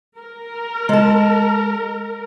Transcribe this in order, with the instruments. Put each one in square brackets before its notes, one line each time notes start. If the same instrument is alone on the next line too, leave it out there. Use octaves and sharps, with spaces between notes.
[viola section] A#4
[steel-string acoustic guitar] G#3 A5